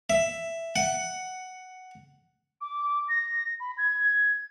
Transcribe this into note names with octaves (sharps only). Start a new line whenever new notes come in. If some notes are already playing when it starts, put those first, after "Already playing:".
E5
F#5
D6
A#6
B5
G#6